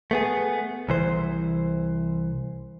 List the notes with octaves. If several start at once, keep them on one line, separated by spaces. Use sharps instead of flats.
A3 B3 G#4
C2 E3 C5